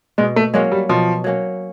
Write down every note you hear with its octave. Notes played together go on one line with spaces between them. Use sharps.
B2 G#3
A3
F#3 G#3 A#3 C#4
G3
B2 F3
F#3 A#3 C#4